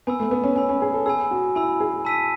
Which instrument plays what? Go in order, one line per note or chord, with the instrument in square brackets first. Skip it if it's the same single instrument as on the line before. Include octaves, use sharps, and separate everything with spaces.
[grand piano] B3 [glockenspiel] G#5 B5 E6
[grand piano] A3
B3
C#4
[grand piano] C#4 [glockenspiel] G#5 B5 E6
[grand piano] C#4
G#4
A4
[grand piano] G#4 [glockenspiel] G#5 B5 E6
[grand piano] F#4
[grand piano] E4 [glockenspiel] G#5 B5 E6
[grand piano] G#4
[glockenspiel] A5 E6 B6 D#7